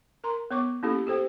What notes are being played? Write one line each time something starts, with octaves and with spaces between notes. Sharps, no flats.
A#4 A#5 C6
B3 C#5 C#6 D6
A#3 C#4 E4 G4 A4
G4 A4 C5 G5